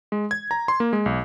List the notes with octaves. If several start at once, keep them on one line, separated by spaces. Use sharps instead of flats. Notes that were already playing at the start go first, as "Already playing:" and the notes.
G#3
G#6
A#5
C6
A#3
G#3
B1